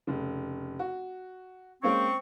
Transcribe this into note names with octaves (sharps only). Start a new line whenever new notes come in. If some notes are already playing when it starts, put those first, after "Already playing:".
F1 C#3
F#4
G#3 A#3 C4 C#4 C#6